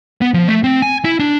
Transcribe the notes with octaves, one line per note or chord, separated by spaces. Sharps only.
B3
F3
A3
C4
G#5
E4
D4